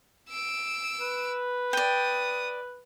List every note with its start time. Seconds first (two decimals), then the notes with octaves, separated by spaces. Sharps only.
0.29 E6 D7
1.01 B4
1.73 D5 G5 D#6